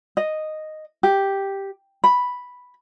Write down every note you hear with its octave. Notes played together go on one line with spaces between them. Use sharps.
D#5
G4
B5